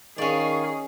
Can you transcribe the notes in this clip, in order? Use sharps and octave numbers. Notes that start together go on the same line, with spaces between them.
D#3 C#4 G#4 D5 F5 C#6